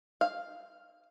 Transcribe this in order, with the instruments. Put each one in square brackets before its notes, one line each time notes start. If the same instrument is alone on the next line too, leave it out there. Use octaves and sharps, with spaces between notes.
[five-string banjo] F5